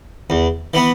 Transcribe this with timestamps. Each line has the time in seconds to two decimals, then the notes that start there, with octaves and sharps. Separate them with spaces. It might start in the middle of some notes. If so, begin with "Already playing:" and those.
0.30 E2
0.74 E3 B3